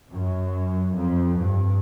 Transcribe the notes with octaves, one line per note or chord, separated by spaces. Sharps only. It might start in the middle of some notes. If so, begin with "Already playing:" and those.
F#2
F2
G2